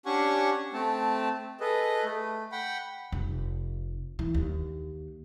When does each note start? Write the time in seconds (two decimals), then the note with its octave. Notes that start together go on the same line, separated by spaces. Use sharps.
0.06 C#4 D4 G4 F#5 G#5 C#6
0.73 A3 C4 A5
1.60 G#4 A4 B4 D#5
2.04 A3
2.52 F#5 G5 B5
3.12 F1
4.19 E3
4.35 D#2